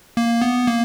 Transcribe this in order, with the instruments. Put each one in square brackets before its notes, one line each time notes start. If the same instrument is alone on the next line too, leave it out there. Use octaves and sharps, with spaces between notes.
[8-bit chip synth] A#3
B3
A#3